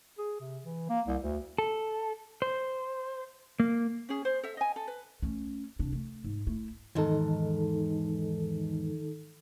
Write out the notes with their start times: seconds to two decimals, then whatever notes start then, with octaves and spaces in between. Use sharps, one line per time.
0.18 G#4
0.41 C3
0.64 E3
0.89 A#3
1.07 C2
1.22 D2
1.58 A4
2.42 C5
3.60 A#3
4.09 C#4 G#4
4.25 C5
4.43 A4 E5
4.57 D#5 G#5
4.76 A4
4.88 B4
5.22 A3 C#4
5.79 C2 D4
5.92 A3
6.24 G#2
6.47 A3 E4
6.95 E2 G#2 D#3 D#4 A4